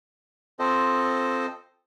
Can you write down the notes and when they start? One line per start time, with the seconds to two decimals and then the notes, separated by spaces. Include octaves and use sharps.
0.59 C4 F4 A4 C5 D#5